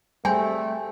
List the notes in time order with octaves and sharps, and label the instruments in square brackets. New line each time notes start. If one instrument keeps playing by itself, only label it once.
[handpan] G3 G#4 C5 [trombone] A3 [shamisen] C4 [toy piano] G#5